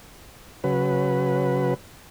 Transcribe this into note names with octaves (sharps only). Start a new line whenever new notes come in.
C#3 F#3 B4